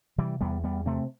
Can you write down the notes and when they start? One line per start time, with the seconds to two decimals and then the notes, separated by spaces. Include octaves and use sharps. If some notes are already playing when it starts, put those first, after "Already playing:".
0.18 C3 E3 G3
0.41 E2 G3 B3
0.64 E2 G3 B3
0.86 C3 A3 C4